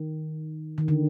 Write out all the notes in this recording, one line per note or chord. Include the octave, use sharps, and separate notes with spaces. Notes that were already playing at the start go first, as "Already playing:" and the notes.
Already playing: D#3
D#3
D3